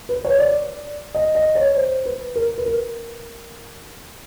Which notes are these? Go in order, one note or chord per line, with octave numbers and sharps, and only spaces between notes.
B4
C#5
D5
D#5
D#5
C#5
C5
B4
A#4
B4
A#4